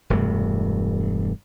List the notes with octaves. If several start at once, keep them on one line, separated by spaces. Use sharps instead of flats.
E1 G2 C3 A3